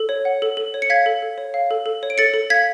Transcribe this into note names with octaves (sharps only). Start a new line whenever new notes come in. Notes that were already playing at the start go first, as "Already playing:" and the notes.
Already playing: A4
C#5
F#5
A4
A4
C#5
C#7
F5 G#6 B6
A4
A4
C#5
F5
A4
A4
C#5
D7
A4 A6 C#7
A4
F5 G#6 B6